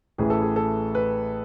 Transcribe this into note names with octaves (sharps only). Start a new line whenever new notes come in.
A1 A2 E3 G#4
A4
G#4
A4
B4